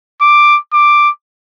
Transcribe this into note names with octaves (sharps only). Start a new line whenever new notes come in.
D6
D6